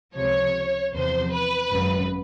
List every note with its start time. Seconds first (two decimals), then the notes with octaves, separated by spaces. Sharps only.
0.15 C#2 C3 F3 C#5
0.93 E2 C3 F3 C5
1.32 B4
1.72 G#1 F#2 C#3